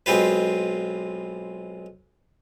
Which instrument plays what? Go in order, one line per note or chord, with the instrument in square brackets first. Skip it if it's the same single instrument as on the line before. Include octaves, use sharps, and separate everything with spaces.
[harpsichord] B1 G#3 C4 F4 B4